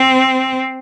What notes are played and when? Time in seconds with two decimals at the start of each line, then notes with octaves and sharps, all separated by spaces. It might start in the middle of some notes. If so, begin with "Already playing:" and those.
Already playing: C4